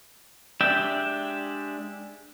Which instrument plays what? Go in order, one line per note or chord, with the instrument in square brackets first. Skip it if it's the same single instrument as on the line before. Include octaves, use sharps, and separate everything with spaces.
[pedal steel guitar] G#3 D4 G4 E5 G5